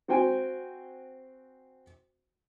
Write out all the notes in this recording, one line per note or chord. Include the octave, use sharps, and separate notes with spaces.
C4 F#4 C5 G5 G#5